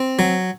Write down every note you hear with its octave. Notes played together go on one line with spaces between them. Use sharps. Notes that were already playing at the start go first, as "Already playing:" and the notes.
Already playing: C4
F#3